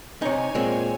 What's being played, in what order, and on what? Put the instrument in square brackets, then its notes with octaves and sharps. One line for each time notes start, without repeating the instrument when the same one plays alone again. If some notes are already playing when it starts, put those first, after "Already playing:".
[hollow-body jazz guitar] C3 D#4 [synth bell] C#5 G#5
[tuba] A#2 [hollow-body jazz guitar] G#3 C4